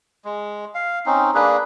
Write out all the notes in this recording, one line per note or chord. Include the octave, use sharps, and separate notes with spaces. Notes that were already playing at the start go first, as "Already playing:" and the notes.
G#3
F5
C4 C#4 D#4
A#3 D4 G#4 B4